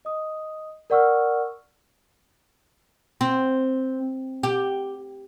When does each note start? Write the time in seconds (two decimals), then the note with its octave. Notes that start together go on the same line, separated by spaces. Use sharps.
0.05 D#5 D#6
0.90 A#4 D5 F#5 C#6 E6 F6
3.21 C4
4.43 G4